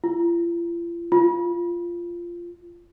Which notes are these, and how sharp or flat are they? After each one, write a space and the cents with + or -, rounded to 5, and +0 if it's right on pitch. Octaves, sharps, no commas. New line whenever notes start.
F4 -40
F4 -10